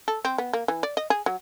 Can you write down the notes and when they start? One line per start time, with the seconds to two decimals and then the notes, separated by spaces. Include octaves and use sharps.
0.08 A4
0.25 C4
0.38 B3
0.53 A#3
0.68 E3
0.83 D5
0.97 D#5
1.10 G#4
1.26 F#3